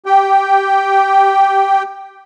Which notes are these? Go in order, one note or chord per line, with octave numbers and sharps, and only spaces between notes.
G4 G5